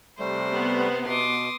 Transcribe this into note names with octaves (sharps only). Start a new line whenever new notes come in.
C3 G3 A3 C5
B3
B2 C6 D6 D#6